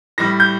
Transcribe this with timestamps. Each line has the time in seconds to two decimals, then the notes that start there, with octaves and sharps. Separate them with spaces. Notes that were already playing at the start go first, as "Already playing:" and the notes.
0.18 A2 G3 A#6
0.40 G6